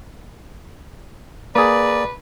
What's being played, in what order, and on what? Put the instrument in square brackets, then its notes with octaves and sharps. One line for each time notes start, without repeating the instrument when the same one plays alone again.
[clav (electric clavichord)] A#3 G#4 [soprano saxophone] B4 [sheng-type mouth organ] D5